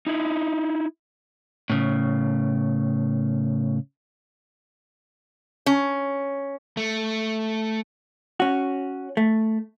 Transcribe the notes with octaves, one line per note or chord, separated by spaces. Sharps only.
D#4 E4
A2 C#3
C#4
A3
C#4 F#4
A3